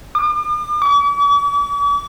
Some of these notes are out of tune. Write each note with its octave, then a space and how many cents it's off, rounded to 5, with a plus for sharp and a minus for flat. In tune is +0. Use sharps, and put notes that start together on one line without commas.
D6 +45
D6 -45